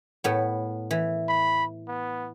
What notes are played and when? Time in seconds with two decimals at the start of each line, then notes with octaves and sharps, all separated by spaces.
0.24 A2 B3
0.91 E3
1.29 B5
1.88 B3